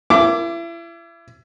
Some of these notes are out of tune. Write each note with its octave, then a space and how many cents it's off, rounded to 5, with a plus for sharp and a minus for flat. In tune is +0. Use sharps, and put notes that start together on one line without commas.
E4 +35 D6 -10